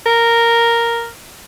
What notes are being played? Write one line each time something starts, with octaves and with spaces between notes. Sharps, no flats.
A#4